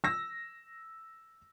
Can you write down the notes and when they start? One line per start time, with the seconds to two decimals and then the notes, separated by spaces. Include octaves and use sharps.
0.04 E6 A#6